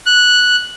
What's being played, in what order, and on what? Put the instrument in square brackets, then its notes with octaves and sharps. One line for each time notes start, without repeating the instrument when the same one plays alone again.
[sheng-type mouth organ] F#6